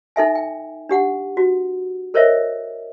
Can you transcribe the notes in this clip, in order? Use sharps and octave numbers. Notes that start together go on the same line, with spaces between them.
D#4 A4 E5 G#5
G5
D4 G4 F#5
F#4
A4 A#4 C5 C#5 D#5 E5